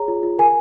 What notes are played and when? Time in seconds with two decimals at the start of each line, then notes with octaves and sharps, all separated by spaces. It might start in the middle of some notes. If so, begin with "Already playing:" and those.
Already playing: G#4 C#5 A#5
0.08 F4
0.23 F4
0.38 A#4 G#5